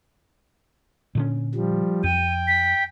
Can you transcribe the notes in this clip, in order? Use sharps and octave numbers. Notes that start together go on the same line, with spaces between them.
A#2 D3 C#4
F3 G3
F2 G5 D#7
B6